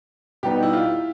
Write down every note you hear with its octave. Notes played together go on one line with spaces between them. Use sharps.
B2 G3 B3 D#4 G4
E4
F4